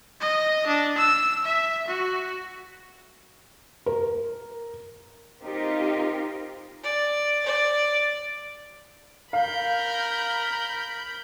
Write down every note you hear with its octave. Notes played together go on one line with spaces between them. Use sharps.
D#5
D4
E6
E5
F#4
A#4
C4 D#4 F4 G4 A#4
D5
D5
A#4 F5 B5 G6